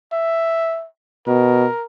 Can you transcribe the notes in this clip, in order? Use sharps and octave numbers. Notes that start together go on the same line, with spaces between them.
E5
B2 A#4